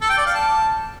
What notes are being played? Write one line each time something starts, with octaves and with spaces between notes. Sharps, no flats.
A4
G5
D5
F5
A5